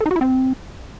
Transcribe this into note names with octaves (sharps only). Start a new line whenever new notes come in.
A4
D#4
F#4
E4
C4